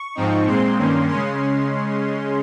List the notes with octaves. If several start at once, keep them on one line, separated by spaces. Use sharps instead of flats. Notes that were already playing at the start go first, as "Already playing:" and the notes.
Already playing: C#6
G#2 F3 C4 D#4
A#2 G#3 C4 C6
G2 D#3 A#3 C#4
C#3 G#3 C#4 C6